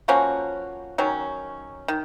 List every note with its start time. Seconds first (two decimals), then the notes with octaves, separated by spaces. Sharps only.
0.08 F3 A#3 C#4 F#4
0.98 D#3 F#3 C#4
1.88 D#3